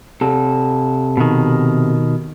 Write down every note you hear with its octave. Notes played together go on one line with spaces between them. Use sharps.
C3 A4
B2 D#3